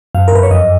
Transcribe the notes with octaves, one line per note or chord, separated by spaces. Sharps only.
F#2 F5
A#4
F#2 B4
C#5
F2 D#5